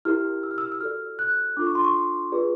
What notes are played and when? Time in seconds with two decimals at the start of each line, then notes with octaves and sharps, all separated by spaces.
0.05 E4 G4 A#4 F6
0.43 E6
0.51 F6
0.58 E6
0.72 E6
0.81 F#4 A4 D5 F6
1.19 F#6
1.57 D4 F4 A4 D6
1.66 C#6
1.75 C6
1.85 C#6
2.32 F4 G#4 B4 D5